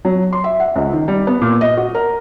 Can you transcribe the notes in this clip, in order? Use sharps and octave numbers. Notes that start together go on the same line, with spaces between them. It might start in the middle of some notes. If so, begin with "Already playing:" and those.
F#3
C6
E5
F#5
C#2
D#3
G3
B3
A#2
D#5
F#4
A#4